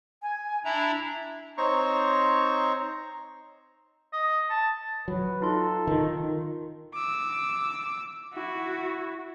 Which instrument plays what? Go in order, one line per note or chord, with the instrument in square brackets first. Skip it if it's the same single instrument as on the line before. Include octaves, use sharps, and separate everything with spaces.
[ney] G#5
[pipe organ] D4 E4 A#5 [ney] E5
[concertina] C4 D#4 C5 C#5 A#5 C#6
[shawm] D#5
A5
[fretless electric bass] F#3 [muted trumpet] B4
[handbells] D#4 F4 C6 [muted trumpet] A4
[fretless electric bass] D#3
[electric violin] D6 E6
E4 F#4